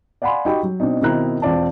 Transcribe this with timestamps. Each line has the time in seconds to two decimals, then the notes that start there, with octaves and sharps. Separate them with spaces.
0.22 D5 F5 F#5 G#5 B5 C6
0.45 D#4 F#4 G4 G5 B5 C#6
0.63 F#3
0.80 B2 C4 D4 D#4
1.02 B2 D#3 C4 E4 A#5 F#6
1.42 E1 C4 F4 D5 F5 A5